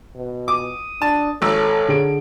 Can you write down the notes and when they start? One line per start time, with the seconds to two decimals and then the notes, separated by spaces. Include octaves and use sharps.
0.16 B2
0.48 D6 D#6
1.02 D4 A5
1.42 G#1 A4 C#5 E6
1.88 D3 G#4 D7